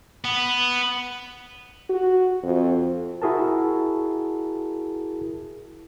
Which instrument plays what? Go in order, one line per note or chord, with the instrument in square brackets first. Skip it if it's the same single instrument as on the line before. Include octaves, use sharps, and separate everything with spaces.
[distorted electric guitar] B3
[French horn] F#4
F2
[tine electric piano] E4 F#4 G#4 A#4 A5